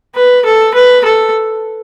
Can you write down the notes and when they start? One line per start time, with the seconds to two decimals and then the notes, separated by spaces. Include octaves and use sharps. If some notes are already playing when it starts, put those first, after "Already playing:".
0.15 B4
0.45 A4
0.74 B4
1.05 A4